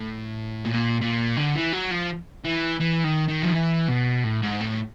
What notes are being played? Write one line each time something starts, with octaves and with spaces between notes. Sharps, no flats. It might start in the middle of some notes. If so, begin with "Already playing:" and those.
Already playing: A2
A#2
A#2
D3
E3
F#3
F3
E3
E3
D#3
D#3
F3
E3
B2
A2
G#2
A2